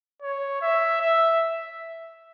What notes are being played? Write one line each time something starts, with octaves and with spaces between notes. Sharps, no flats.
C#5
E5
E5